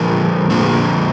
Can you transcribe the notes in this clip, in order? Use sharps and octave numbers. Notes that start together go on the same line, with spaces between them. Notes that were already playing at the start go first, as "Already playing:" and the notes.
Already playing: D3 F3 A#3 A#4
D3 F3 A#3